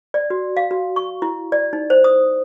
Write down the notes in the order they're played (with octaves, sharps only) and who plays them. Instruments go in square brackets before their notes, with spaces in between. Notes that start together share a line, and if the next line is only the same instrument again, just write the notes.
[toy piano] D5
F#4
F5
F#4
C#6
E4
D5
D#4
C5
D#6